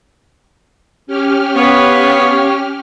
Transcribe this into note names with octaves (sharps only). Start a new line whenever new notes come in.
C#4 G4 F6
B3 C#5 F5